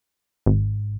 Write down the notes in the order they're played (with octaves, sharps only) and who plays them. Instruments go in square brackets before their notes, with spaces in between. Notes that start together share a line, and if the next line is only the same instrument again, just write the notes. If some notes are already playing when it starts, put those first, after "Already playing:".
[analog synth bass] G#1